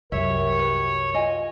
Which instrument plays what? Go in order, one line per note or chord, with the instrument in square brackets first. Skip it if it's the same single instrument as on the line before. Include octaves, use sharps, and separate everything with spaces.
[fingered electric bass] C2 F#2 [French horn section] F#4 G4 A#4 [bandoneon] C#5 [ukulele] E5
[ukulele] B4
[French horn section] F4 F#4 [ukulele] D#5 G#5